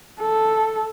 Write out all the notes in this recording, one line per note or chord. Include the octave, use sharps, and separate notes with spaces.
A4